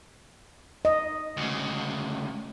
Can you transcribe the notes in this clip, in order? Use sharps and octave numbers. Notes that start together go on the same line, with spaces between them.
D#5
D2 C#3